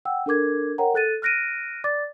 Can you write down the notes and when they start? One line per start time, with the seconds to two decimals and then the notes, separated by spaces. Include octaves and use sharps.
0.05 F#5 G5 E6
0.26 D4 A4 A#4 D6 G#6
0.78 A#4 C#5 F#5 G5 A#5
0.94 A4 F#6 A6 D#7
1.22 F6 F#6 A#6 D7 D#7
1.84 D5 D6 A6